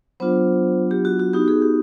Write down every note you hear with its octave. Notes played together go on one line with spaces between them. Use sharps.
F#3 B3 D4 F4 C5
G4
F#4
F#4
B3 D#4 F#4 G4
G#4
G4